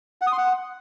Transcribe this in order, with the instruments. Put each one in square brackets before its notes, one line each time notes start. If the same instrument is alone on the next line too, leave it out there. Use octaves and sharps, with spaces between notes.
[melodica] F#5
D#6
C6
F#5